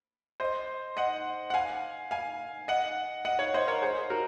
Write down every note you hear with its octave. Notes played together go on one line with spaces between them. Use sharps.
C5 D#5
D#5 F#5
F#5
F5 G#5
F5 G#5
D#5 F#5
D#5 F#5
C#5 F5
C5 D#5
A#4 C#5
G#4 C5
F#4 A#4